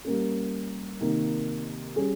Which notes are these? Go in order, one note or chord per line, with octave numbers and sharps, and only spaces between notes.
G3 A#3 C#4
C3 D#3 A#3
G3 C#4 G#4